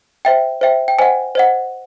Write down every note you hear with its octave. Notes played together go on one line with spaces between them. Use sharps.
C5 E5 G5
C5 E5 G5
G5
C5 D#5 F#5 G#5
C5 D#5 F#5